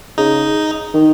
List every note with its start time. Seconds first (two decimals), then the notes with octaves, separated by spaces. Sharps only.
0.18 C#3 D#4
0.94 D#3